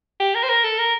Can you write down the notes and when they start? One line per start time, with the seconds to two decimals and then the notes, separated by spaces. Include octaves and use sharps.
0.20 G4
0.35 A#4
0.43 C5
0.49 A#4
0.64 A4
0.78 A#4